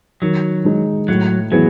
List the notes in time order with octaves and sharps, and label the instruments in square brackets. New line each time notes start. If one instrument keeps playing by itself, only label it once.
[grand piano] D#3 [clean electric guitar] F#3
[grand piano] G#3 D#4
[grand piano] A2 [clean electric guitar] F#3
[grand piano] E3 B3 E4 G#4 [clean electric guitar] F#3